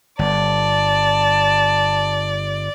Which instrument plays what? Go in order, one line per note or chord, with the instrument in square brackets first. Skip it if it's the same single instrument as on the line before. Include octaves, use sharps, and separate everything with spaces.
[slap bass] G1 [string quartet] D5 [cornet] A5